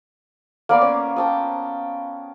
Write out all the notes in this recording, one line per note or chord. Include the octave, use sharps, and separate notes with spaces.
A#3 B3 D5 F5
C#4
G5 A5 D#6